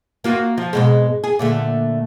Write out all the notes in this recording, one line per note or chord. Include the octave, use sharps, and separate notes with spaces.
A#3 F4 F#4
F3
G#2 B2 G#3
G#4
A#2 D3 A3